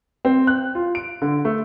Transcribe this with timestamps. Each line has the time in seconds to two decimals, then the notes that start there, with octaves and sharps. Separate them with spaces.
0.25 C4
0.47 F#6
0.75 F4
0.95 D7
1.22 D3
1.45 A3